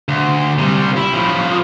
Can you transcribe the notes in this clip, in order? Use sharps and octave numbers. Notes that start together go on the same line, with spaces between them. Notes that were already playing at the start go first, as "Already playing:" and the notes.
D2
C3 G3
E4
A2 F3